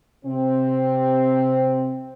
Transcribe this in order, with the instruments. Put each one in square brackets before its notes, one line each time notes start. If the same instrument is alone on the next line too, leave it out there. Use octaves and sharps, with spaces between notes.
[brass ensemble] C3 C4